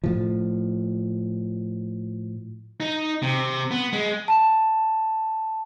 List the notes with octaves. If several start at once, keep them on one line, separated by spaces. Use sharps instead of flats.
A2 F3
D#4
C3
B3
G#3
A5